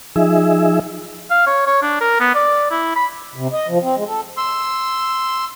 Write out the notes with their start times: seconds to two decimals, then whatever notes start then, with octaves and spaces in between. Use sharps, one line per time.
0.16 F3 D#4 G#4 E5
1.30 F5
1.46 C#5
1.66 C#5
1.82 D4
2.01 A#4
2.20 B3
2.35 D5
2.71 E4
2.96 B5
3.35 C3
3.53 D#5
3.68 F3
3.82 C4
3.96 G#3
4.07 A4
4.37 C6 E6